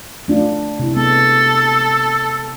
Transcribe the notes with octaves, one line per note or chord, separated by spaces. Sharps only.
A3 D4 F4
C3 E4
G#3 B3 A4